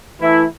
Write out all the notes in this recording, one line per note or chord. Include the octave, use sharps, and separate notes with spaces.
E3 A3 E4